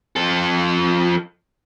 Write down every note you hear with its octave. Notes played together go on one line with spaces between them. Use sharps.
F3 A4